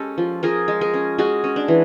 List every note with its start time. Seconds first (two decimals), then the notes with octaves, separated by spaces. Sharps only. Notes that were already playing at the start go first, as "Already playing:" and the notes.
Already playing: G#3 C#4 G4 A4
0.18 F3
0.43 F3 G#4 A#4
0.68 G#3
0.81 G#4 A#4
0.94 C#4
1.18 G#3 F#4 G#4
1.44 C#4
1.56 D4
1.68 E3